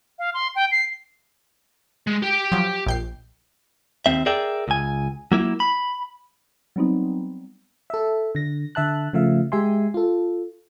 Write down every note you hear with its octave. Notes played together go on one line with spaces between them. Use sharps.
F5
C6
G5
C7
G#3
G4 G5
F3 F#3
A#1 G5 C7
D#2 C4 E5
G#4 A#4 D5 E5 G5
C#2 G#5
F#3 A#3 E4
B5
F#3 G3 B3 C4 D#4
A4 E5
D3 A#6
D3 E5 A5 F#6
C#3 F3 A3 E5 F5
G#3 G4 E5 G#5 C6
F4 A4